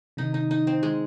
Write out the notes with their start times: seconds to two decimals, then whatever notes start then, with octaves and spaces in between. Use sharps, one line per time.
0.17 C3 D#3 D#4
0.34 D#4
0.51 D#4
0.67 C4
0.83 G#3